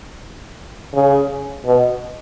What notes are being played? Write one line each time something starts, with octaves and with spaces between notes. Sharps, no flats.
C#3
B2